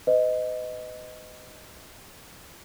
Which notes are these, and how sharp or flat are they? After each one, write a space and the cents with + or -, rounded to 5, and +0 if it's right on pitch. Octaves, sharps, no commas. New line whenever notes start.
B4 +45 D#5 +0